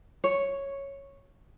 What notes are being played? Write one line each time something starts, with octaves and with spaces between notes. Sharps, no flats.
C#5